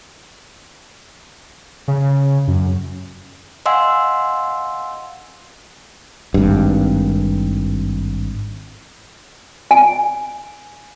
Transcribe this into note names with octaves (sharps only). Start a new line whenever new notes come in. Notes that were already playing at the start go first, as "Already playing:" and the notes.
C#3
F#2
D#5 F5 F#5 G#5 C6 E6
G#1 G2
G#5